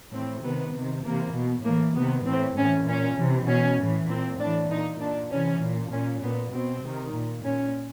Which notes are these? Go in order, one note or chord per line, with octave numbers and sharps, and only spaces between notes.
A2 E3 C4
C3 D#3 B3
C3 D#3
C3 E3 A#3
B2
A2 E3 A#3
C3 D#3 B3
A2 E3 C4
A2 E3 C#4
A#2 C#4
C3 E3
B2 C#4
A2 E3
A#2 C4
A2 E3 D4
A#2 D#4
A#2 D4
C3 E3 C#4
A#2
A#2 C#4
A#2 B3
B2 C4
C3 D#3
A#2
A#2 C#4